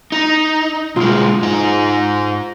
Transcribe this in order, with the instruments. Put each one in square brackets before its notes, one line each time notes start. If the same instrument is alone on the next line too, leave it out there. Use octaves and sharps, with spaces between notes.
[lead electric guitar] D#4
[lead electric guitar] B1 G#3 [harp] F4
[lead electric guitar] G#2 D#4